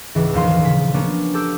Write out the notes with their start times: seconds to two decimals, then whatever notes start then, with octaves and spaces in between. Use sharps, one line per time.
0.15 C#2 G#2 E3
0.33 E1 D#2 F3 F5 C6
0.49 D#1
0.62 A#2 C#3 B6
0.94 A#3 B3 C#4 D4
1.34 G4 A4 D6 E6 G6